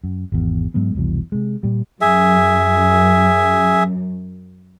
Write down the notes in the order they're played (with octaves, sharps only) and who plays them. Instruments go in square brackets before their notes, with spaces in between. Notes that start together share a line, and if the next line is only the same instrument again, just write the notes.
[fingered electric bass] F#2
G#1 E2
G#2 F#3 G#3 B3
F1 C2 B2 E3
C3 G#3
A#2 G3
[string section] F#2 [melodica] G#4 E5